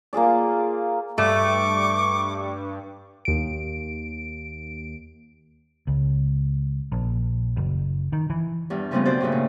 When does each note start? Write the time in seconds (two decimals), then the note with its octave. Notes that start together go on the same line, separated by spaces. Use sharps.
0.13 A#3 F4 G#4 D5
1.18 G2 A3 C#6 D6
3.25 D#2 D7
5.87 C#2
6.92 A#1
7.57 F#1
8.12 D#3
8.30 E3
8.70 E2 G2
8.91 C#3 F3 G3 A3 B3 C4
9.05 B2 F#3 C5 D5 G6
9.21 G2 A#2 C#3 E3
9.32 A#2